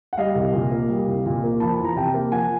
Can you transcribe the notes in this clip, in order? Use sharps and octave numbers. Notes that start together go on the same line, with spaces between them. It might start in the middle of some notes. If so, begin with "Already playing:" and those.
F#5
G3 D#5 F5
C2
A#2
A#3
G3
C2
A#2
A#3
F3 A5 B5
E2
A#5
C3 G5 A5
A#3
F3 F#5 G#5